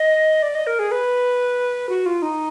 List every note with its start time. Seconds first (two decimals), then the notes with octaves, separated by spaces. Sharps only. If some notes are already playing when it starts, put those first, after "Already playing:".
Already playing: D#5
0.42 D5
0.55 D#5
0.67 A#4
0.79 G#4
0.92 B4
1.89 F#4
2.06 F4
2.22 D#4